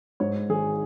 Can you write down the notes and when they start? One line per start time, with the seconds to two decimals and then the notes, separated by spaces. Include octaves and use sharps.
0.20 G#2 C#5
0.50 G#1 G#4